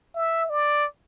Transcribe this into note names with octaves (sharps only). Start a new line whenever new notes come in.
E5
D5